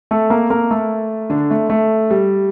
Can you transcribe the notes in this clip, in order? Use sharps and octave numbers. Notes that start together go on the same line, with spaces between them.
A3 A4
A#3 A#4
A#3 A#4
A3 A4
D3 D4
A3
A3
G3